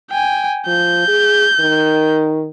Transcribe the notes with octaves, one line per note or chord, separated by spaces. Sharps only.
G5 G#5
F3 G6
G#4
D#3